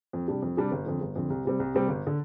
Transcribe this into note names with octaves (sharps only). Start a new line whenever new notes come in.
F2
C3 G3 D4 G4
F2
C3 G3 D4 G4
G1
F2 D3
G1
F2 D3
C2
C3 G3 C4
C2
C3 G3 C4
G1
D3